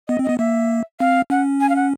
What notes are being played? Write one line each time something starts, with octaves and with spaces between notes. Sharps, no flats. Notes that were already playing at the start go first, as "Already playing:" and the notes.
B3 D#5
C4
D#5
B3
A#3 E5
C4 F5
C#4 F#5
G#5
F5
F#5